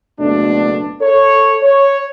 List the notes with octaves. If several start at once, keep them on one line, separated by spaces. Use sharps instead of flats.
F#1 B2 A3 D4
A4 C#5
C#5